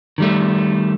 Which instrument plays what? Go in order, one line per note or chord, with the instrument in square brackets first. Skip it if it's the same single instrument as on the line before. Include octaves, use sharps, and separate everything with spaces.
[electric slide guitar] D#3 G3 A3